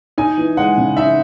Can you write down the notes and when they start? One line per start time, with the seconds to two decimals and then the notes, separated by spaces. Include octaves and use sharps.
0.18 D#4 G#5
0.38 E3
0.57 G#3 F#5
0.78 C#3
0.97 D#4 E5